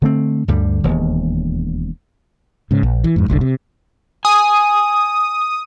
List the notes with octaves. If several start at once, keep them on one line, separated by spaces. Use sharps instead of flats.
D3 A3 C4
D2 G2 D3 G3
E1 D#2
G#2 C#3
A#1
E3
F2 G#2
F#1 C2 A2 D3
C3
G#5 D#6